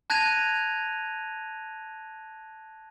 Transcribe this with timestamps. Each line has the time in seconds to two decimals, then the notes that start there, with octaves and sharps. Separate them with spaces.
0.10 A5 F#6 G#6 A#6 D#7 F7